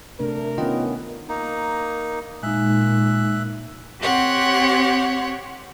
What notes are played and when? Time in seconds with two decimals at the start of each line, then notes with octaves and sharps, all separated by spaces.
0.20 C3 A3 D4 A#4
0.58 D#3 B3 C#4 F4 D#5 G5
1.29 A#3 D#4
2.43 A#2 G#3 D#4 E5 F#6
3.99 C4 G4 C#5 F#5 C6